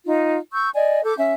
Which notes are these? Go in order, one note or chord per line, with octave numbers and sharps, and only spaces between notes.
D#4 F4
C#6 E6 G6
D5 D#5 G#5
A4 D6 G6
C#4 E5